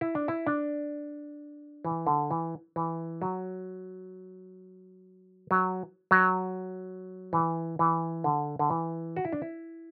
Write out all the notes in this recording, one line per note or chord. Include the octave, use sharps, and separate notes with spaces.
E4
D4
E4
D4
E3
D3
E3
E3
F#3
F#3
F#3
E3
E3
D3
D3
E3
F#4
E4
D4
E4